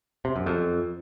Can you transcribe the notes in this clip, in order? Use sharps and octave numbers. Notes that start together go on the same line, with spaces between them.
C3
F#2
F2